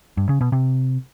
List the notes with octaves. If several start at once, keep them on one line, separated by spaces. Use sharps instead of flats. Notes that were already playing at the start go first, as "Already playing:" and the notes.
G2
C#3
B2
C3